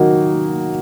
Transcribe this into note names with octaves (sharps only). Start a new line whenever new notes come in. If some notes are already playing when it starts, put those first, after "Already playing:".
Already playing: D#3 F#3 A#3 D#4 F#4